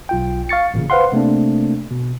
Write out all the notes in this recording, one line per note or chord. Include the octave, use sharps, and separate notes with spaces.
B1 F4 G5
F5 C#6 A6 C#7
A1 A#2 C#3
B4 C5 F5 F#5 C6
C3 A3 A#3 C4 D4
B2